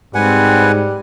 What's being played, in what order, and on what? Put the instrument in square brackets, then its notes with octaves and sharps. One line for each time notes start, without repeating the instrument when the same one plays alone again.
[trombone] G#2 [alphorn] G3 [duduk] C4 [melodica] B4 F#5 G#5